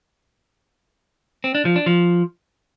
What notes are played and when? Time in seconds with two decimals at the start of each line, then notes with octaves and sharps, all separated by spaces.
1.44 C4
1.55 D4
1.65 F3
1.76 D4
1.86 F3